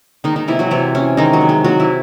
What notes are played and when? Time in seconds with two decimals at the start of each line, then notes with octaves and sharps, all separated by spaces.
0.24 D#3 G#3 D#4
0.36 D#3 D#4
0.48 C3 E3 E4
0.59 F#3 F#4
0.71 C3 E3 E4
0.95 E3 C#4
1.17 D#3 G#3 D#4
1.33 F#3 F#4
1.41 C3
1.49 G#3 G#4
1.64 C3 F#3 F#4
1.80 E3 E4